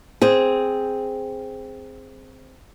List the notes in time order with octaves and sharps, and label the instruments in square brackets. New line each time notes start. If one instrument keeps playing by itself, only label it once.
[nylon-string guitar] C4 G#4